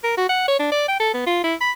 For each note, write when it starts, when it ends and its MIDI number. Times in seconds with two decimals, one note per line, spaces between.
0.04 0.16 70
0.17 0.28 66
0.29 0.45 78
0.48 0.58 73
0.60 0.69 62
0.72 0.85 74
0.88 0.99 79
1.00 1.11 69
1.14 1.22 59
1.26 1.42 65
1.44 1.54 64
1.61 1.71 83